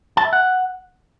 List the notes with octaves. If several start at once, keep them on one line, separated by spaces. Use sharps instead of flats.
A5
E5
F#5